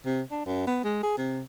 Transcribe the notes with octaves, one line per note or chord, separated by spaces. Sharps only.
C3
D4
F#2
B3
G#3
G#4
C3